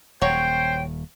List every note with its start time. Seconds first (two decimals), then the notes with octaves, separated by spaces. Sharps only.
0.22 D#1 F#3 C5 C#5 G5